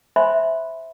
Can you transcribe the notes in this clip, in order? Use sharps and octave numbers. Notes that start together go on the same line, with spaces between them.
C5 E5 G#5 B5 C6